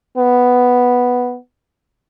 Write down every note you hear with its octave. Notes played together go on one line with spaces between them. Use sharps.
B3